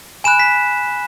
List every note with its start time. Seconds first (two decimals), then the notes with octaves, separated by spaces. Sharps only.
0.24 G#5 B5 F#6 E7
0.39 B6